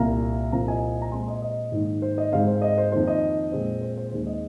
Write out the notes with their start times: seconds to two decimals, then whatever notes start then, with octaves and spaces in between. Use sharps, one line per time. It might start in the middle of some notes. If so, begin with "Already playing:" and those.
Already playing: C2 A#2 A#3 F5 A#5
0.52 C2 A#2 F3 C4 F5 A#5
0.68 D#5 G#5
1.02 A#5
1.12 A#2 G#3 C4 G#5 C6
1.28 D#5
1.42 D#5
1.72 G#2 D#3 A#3
2.02 C5
2.18 D#5
2.32 G#2 G#3 C4 C5 F5
2.47 C5
2.62 D#5
2.78 C5
2.92 F2 D#3 A#3 C5
3.07 D#5
3.52 A#2 G#3 C4
3.81 C5
3.97 C5
4.12 D#2 D#3 G#3 C4 C5
4.27 D#5